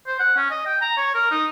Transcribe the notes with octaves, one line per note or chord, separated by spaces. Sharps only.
C5
F#5
C#4
D#5
G5
A#5
C#5
A#4
D#4